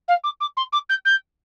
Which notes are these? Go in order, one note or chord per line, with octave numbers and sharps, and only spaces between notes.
F5
D6
D6
C6
D6
G6
G6